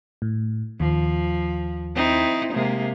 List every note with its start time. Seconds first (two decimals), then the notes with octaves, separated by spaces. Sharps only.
0.22 A2
0.80 D#2 F3
1.95 C4 D#4 E4
2.54 C3 G#3 A#3